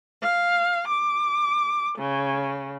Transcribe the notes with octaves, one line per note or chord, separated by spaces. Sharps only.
F5
D6
C#3